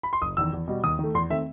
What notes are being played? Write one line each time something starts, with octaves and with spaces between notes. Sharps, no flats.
B5
C6
F#1 D#6
E2 D#3 E6
E2
B2 G3
D#2 D#6
D#3 A3
E2 C6
D#3 A3 C4 E5